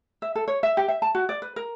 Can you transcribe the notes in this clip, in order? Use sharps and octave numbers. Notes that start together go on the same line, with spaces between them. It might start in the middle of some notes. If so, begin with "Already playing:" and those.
E5
A4
C#5
E5
G4
E5
A5
F#4
D5
B4
A#4